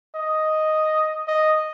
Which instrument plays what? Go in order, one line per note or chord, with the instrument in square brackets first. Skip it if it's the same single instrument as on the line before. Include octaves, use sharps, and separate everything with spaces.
[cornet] D#5
D#5